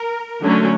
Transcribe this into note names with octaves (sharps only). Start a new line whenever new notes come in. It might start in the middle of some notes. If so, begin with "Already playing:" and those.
Already playing: A#4
D3 F#3 A3 C#4